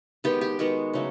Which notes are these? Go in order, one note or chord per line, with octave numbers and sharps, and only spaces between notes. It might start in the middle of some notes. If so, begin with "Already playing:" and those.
D#3 G#3 B3 G4
G4
D#3 G#3 B3 F#4
C#3 F#3 A3